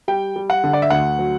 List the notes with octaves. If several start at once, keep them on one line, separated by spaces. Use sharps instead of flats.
G3 G5
G3
F#5
D3
D5
E5
D2 F#5
F#3